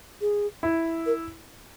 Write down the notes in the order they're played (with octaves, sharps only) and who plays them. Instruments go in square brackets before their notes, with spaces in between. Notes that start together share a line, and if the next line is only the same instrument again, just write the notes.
[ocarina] G#4
[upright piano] E4
[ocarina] A#4